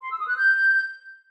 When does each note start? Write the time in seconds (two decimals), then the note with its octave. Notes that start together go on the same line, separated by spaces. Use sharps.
0.02 C6
0.11 E6
0.20 D#6
0.28 F#6
0.37 G6